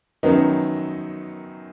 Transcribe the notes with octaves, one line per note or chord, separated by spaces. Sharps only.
F#2 D#3 F#3 B3 D#4